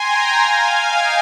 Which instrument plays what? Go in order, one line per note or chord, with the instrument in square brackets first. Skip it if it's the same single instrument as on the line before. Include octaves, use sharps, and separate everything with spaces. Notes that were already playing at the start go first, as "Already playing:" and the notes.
Already playing: [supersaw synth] G5 G#5 A#5 C6
F5 G#5
D#5 G5